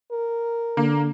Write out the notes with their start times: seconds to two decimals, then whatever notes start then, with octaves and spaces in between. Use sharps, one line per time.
0.12 A#4
0.77 D3 A#3